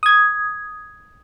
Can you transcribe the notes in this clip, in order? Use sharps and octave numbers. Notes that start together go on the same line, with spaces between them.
D#6 G#6